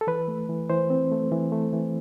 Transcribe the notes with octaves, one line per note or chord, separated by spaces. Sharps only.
A4
E3 B4
A3
E3
E3 C5
C4
A3
E3
A3
E3